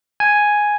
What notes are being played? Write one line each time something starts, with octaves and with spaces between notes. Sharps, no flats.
G#5